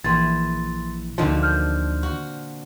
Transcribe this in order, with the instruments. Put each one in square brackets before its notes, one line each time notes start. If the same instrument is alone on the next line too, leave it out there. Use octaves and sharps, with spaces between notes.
[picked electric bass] A#1 [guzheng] E3 [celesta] C6 A6
[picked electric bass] D2 D#3 F3 [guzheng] A#2 D3 C4
[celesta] F6 G6
[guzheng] F#4